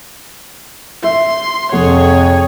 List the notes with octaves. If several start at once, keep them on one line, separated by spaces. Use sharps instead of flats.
E5 C6
F1 F2 G#4 A4 C#5 F#5